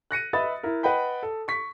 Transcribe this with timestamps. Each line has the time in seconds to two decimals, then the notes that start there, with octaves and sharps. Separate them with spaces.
0.11 F#6 A#6 C#7 D#7
0.33 B4 D#5 E5 B5 D#6 A6
0.63 E4 A#4
0.83 B4 D#5 F#5 G5 B5
1.23 A4
1.48 C#6 B6